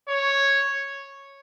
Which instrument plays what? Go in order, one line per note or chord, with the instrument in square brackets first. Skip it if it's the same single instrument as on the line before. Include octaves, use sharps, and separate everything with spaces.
[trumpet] C#5